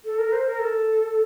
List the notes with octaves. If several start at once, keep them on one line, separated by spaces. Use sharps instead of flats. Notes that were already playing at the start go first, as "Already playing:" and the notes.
A4
A#4
C5
A#4
A4